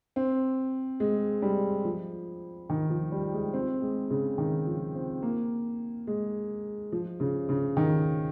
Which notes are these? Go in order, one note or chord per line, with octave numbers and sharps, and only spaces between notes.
C4
G#3
G3
F3
D#3
F3
G3
G#3
C4
G#3
C#3
D#3
F3
C4
A#3
G#3
F3
C#3
C#3
D#3